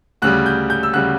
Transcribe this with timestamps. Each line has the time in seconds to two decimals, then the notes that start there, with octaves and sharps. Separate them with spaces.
0.22 D2 C#3 G3 F#6
0.46 G6
0.70 G6
0.83 E6
0.93 D2 C#3 G3 F#6